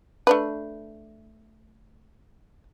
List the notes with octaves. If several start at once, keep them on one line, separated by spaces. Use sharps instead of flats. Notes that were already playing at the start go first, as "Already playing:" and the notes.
A3 D4 B4